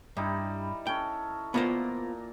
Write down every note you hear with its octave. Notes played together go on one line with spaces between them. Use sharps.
G2 G3 D#4 E4
C#4 A4 G5
A#2 B3 F4 C5 A#5 D6